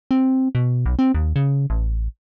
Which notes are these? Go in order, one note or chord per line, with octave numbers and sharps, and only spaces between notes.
C4
B2
B1
C4
D#2
C#3
A1